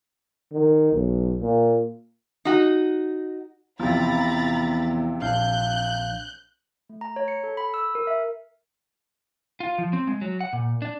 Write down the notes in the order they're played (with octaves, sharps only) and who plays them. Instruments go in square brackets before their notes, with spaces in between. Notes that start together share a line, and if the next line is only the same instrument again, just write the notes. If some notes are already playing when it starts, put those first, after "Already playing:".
[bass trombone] D#3
B1
A#2
[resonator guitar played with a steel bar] D#4 F#4
[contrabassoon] E2 [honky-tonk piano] C3 F3 [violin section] A#5 B5 A6
[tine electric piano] A#1 D4 F5 [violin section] F#6 G6
[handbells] A3
A#5
C#5
C#7
A4
B5
E6
A#4
E5
[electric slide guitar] F4
F3
C4
G#3
F#3
F#5
A#2
D4